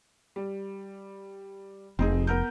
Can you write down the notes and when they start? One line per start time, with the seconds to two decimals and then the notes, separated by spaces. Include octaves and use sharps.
0.36 G3
1.99 F1 C4 D#4 G#4
2.27 B3 A#4 G6